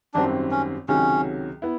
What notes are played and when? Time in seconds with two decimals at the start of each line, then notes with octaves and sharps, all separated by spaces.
0.14 G#1 F#2 D#3 G3 C4 D4
0.51 C#4
0.88 C#2 C3 D#3 F#3 C#4
1.62 B3 E4